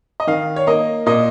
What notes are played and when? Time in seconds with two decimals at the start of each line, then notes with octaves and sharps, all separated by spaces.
0.20 D#5
0.27 D#3 F5
0.56 C#5
0.67 A#3 D#5
1.06 A#2 D#5